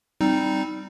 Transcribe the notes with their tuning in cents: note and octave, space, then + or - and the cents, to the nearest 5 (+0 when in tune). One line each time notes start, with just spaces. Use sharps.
G3 +0 C4 +0 D#4 +0